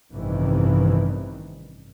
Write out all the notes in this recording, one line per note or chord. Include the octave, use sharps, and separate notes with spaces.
A1 G2 C3 D#3 E3